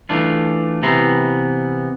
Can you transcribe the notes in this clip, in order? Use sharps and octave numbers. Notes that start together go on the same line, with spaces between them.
E3 A3 D4 F4
C3 E3 B3 E4 A#5 C6